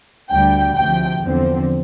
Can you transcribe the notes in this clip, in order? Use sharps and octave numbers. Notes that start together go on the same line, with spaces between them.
D2 D3 G3 G5
D2 C3 F3 G5
E2 D3 F3 C4